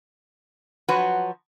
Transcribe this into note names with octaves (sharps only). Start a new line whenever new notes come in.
F3 F#3 F#4 B4